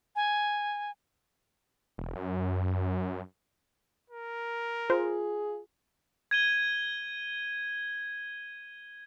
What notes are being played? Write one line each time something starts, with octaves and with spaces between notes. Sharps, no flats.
G#5
E1
F#2
A#4
F4 G#4 C5
G#6 D#7 G7